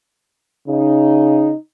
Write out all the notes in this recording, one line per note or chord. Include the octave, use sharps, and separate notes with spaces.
C#3 D#4